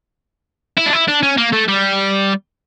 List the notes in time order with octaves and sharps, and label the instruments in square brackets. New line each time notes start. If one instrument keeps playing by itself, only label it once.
[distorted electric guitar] E4
D4
E4
D4
C#4
A#3
A3
G3